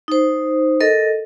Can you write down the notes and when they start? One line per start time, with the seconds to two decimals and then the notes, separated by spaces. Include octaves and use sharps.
0.08 D#4 C5
0.81 A4 A#4 D#5